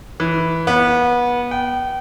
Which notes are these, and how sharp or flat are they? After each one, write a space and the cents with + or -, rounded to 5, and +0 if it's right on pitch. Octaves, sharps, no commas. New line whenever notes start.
E3 -5
B3 -25
G5 -30